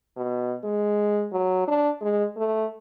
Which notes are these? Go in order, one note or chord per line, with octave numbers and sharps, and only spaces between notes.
B2
G#3
F#3
D4
G#3
A3